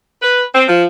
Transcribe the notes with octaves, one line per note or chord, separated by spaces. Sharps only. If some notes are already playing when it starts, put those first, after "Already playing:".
B4
C4
F3